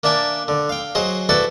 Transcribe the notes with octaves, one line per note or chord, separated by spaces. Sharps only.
A#3 D4 E5 G#5 A5
D3
F5 G5
F#3 G#4 C5 D#5
E4 F#4 A4 B4 D5